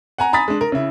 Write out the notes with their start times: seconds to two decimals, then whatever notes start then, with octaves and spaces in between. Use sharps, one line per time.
0.18 F#5 G#5 A#5
0.33 G#5 A#5 B5 D#6 A6 B6
0.48 G#3 D4
0.61 A#4
0.72 C#3 E4